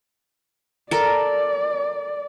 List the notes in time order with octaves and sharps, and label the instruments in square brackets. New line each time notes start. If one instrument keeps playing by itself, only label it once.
[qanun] A4 A#4 [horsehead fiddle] D5